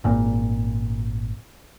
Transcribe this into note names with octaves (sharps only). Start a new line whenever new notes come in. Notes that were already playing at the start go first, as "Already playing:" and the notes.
G#1 A#2